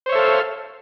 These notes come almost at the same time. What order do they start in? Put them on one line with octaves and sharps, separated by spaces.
C5 C#5 E5 A4 F5